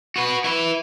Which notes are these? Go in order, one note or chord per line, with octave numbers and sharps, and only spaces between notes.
F#4 B4
E4 B4